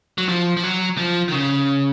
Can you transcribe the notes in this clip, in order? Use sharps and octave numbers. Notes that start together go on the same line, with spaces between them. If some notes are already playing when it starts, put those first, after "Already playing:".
F#3
F3
F3
F#3
F3
D#3
C#3